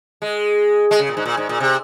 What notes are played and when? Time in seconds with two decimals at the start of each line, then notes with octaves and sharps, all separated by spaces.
0.22 G#3
0.91 G#3
0.99 C#3
1.09 A#2
1.17 G#2
1.25 A#2
1.37 G#2
1.49 A#2
1.60 C3